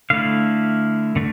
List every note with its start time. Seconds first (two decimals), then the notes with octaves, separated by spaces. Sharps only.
0.10 D3 A3 E4 F5
1.16 D3 A3